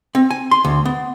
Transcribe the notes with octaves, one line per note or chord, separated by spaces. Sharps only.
C4
G#5
C6
D2
B3